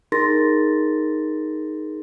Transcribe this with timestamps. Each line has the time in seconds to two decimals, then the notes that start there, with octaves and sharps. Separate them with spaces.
0.12 D#4 G#4 A#4 C6 A6 A#6